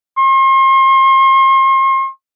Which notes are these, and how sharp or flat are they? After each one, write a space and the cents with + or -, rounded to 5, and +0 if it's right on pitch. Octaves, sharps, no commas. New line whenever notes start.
C6 +40